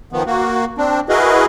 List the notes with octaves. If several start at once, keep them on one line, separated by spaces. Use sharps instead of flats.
D#3 F3 B3
A#3 F#4
C4 D4
E4 F#4 G#4 A#4 B4 D#5